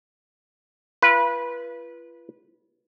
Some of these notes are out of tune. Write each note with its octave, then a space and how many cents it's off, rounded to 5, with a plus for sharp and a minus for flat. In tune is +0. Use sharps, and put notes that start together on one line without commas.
F4 -40 B4 -20